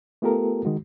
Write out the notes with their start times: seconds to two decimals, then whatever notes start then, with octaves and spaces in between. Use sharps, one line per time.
0.22 A3 B3 F4 G4 A4 A#4
0.65 D#3 G#3 F#4